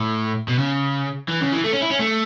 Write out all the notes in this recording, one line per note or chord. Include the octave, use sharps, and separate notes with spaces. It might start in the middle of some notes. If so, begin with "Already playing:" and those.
Already playing: A2
B2
C#3
E3
C#3
E3
A3
C#4
E4
C#4
A3